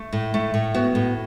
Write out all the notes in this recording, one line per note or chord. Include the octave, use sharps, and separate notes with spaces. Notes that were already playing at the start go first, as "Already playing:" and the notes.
Already playing: A3
A2
A3
A2
B3 F#4
A2